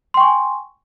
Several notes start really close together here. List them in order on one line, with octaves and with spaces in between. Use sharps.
C6 G5 C#6 G#5